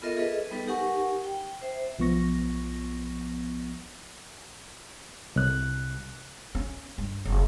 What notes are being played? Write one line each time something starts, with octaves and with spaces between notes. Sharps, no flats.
B3 F4 A4 A#4 D#5 E5
G#4 A4 B4 D#5
G3 B3 D#4 A4 B4
D#4 G4 A#4 F#5 G#5 C#6
G5
C5 E5
B1 F3 B3 C#6 A#6
C2 F#6
C#4
G2
F#1